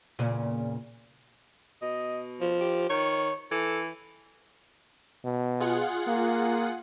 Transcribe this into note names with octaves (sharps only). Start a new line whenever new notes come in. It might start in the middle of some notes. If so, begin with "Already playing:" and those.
E2 A#2 C#3
B2 D#5
F3
G4
D#3 C#5
E3 A4
B2
F4 G#4 F#5
A#3